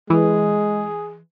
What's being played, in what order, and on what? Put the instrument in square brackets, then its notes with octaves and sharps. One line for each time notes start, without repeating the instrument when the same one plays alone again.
[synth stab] E3 [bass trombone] G#3 [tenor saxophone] G#4